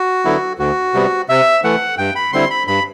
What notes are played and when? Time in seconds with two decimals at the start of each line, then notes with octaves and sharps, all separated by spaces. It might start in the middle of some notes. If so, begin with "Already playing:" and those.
Already playing: F#4
0.25 D3 F#3 B3 E4
0.59 D2 F#4
0.94 C3 G3 B3
1.29 C3 E5
1.64 E3 A3 F#5
1.98 G2 G5
2.15 B5
2.33 D3 G3 C4 E4 C6
2.50 B5
2.67 G2 B5